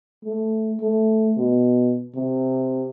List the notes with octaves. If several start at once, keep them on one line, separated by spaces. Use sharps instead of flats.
A3
A3
B2
C3